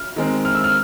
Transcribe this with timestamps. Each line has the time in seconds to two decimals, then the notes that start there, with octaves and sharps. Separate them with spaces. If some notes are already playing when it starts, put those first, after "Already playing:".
Already playing: F6
0.16 D#3 G#3 C4
0.45 F6
0.55 E6
0.64 F6